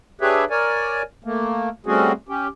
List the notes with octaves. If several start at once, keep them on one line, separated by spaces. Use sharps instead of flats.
D4 G4 G#4 B4 C#5 E5
A#4 C#5 D5 G#5
A3 A#3
G3 A3 C4 C#4 F#4 G#4
C#4 G4